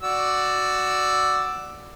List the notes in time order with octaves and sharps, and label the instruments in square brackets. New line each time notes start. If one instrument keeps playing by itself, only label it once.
[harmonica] F#4 D5 E6